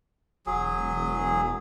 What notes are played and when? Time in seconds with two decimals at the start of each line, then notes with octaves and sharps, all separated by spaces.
0.46 E1 F#3 G#4